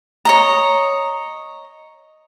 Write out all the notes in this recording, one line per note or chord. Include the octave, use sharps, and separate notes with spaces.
C#5 D#5 A#5